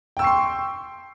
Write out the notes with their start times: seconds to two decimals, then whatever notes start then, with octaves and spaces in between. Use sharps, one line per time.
0.17 G5
0.19 E6
0.22 C#6
0.24 C7
0.27 C6